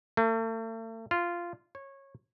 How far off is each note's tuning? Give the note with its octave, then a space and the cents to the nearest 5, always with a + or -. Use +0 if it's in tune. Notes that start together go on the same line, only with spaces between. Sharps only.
A3 +40
F4 -10
C#5 -20